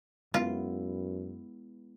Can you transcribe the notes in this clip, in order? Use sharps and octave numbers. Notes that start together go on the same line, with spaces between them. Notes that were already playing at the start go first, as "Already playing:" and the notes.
F#2 G#3 B3 E4 F4